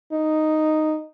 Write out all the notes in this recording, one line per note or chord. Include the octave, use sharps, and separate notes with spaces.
D#4